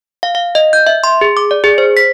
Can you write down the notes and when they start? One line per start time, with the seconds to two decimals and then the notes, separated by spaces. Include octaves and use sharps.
0.23 F5
0.35 F5
0.55 D#5
0.73 G6
0.87 E5
1.04 C6
1.21 G#4
1.37 D6
1.51 D5
1.64 G#4
1.78 C5
1.97 B6